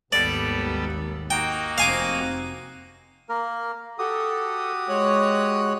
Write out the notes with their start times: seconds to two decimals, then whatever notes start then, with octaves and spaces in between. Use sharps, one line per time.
0.12 G#1 D#2 G3 B3 A4 D5
1.30 A#3 D#4 F#4 G5
1.78 F1 C4 F5 G#5 D6
3.29 A#3 A#4
3.99 F#4 G4 A4 D#6
4.89 G#3 C#5 F#6